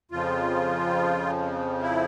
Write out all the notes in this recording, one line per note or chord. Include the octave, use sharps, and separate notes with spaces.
F2 C#3 F3 F4
E4